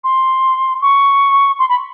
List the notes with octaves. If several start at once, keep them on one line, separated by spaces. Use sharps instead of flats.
C6
C#6
C6
B5